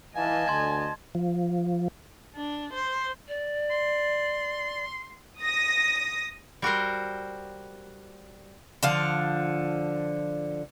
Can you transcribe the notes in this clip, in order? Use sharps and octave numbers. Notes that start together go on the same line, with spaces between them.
E3 D#5 F5 G#5 A5
D2 D3 C6 G#6
F3
D4
C5
D5
C6
D#6 A#6
G3 F#4 A#4 C5
D3 F3 F5